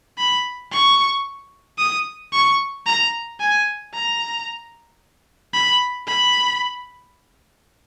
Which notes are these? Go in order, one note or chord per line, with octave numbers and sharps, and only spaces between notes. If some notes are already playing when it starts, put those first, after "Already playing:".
B5
C#6
D#6
C#6
A#5
G#5
A#5
B5
B5